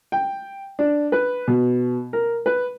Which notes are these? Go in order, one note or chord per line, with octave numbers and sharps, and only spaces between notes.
G5
D4
B4
B2
A#4
B4